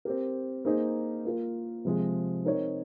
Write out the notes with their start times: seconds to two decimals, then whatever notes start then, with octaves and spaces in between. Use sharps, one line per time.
0.05 C4 G4 A#4
0.65 A#3 D#4 G#4 C5
1.25 A#3 F4 A#4
1.85 C3 F3 G#3
2.45 C4 D#4 A#4 C#5